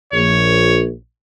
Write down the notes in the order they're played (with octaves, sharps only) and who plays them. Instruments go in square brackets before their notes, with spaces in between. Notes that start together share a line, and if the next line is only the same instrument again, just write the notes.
[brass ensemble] A#1 [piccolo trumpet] C#5